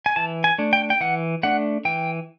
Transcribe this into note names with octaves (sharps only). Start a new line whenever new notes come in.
G#5
E3 A5
G#5
A3 D4
G5
G5
E3 F#5
A3 D4 F#5
E3 G5